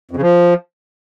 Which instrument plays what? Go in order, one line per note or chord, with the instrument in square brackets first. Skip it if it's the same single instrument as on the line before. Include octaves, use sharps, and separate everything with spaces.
[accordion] F2
C#3
F3